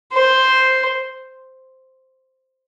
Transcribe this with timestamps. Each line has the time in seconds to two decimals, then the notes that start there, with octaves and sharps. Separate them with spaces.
0.13 C5